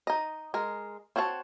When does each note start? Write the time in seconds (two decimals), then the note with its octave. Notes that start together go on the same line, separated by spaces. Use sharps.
0.07 D#4 D#5
0.54 G#3 A#4
1.16 C4 F#4 C#5 F5 A5